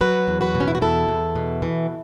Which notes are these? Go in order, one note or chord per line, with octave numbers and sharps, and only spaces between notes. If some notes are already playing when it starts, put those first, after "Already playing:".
F#3 F#4 B4
E2
F#4 B4
B2
C#4
E4
F#4
E2 E4 A4
E2
B2
E3